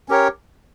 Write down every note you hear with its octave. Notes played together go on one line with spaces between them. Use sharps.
C#4 G4 A#4 C#5